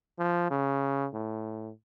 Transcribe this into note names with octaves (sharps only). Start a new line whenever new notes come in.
F3
C#3
A2